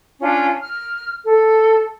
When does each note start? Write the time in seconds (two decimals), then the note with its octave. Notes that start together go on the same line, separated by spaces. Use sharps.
0.22 C#4 D4 F4
0.61 F6
1.24 A4